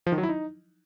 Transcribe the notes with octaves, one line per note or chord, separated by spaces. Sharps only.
F3
D#3
F#3
E4
D#4